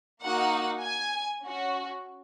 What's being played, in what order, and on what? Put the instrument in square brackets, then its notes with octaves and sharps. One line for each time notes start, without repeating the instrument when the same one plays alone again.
[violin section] A#3 D#4 F#4 F#5
G#5
C#4 F#4